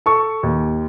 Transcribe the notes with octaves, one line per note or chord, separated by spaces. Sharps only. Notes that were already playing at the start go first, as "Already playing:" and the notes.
A4 C#6
D#2